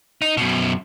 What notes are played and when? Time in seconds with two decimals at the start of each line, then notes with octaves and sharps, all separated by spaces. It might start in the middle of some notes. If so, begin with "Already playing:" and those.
0.22 D#4
0.37 F#2 B2